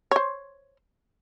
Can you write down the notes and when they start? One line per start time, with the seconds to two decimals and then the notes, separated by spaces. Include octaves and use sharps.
0.11 C5 C#5